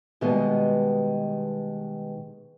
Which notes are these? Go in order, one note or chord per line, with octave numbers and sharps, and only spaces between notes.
B2 D#3 G3 G#3 B3